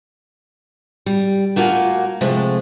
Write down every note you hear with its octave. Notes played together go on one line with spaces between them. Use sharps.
G3
A3 A#3 F4 F#4 C#5 G#5
C3 F3 G#3 A3